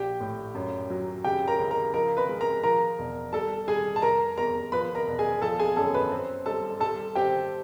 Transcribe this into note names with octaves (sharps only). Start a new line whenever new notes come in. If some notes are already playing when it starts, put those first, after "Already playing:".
Already playing: A#1 G4 G5
A2
F#2
F#3
C#3 G4 G5
A#4 A#5
C#2
A#4 A#5
F3 A#4 A#5
B4 B5
G#3
A#4 A#5
F3 A#4 A#5
E1
G3 A4 A5
G3 G#4 G#5
A5
F1 A#4 A#5
E2 A#4 A#5
F3 B4 B5
A#4 A#5
E1
G#4 G#5
F3 A4 A5
G#4 G#5
F#2 A4 A5
B4 B5
C4
G3 A4 A5
G3 A4 A5
C4 G4 G5